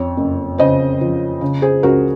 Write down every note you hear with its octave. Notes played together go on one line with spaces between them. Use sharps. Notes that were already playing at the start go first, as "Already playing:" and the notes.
Already playing: F2 C#5
F#1
C#3 C5 D#5
F3
C#3
G#4 C5
C#2 F#4 A#4